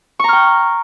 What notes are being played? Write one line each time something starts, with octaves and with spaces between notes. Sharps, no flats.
G5 A#5 C#6 F6